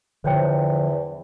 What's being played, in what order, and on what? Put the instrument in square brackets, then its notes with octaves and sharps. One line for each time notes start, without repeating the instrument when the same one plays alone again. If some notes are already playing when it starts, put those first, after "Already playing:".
[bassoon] E2 [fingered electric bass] D3 F3 [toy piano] C5 C#5 G5